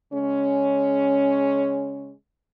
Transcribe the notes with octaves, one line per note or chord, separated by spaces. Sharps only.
C#3 G#3 C#4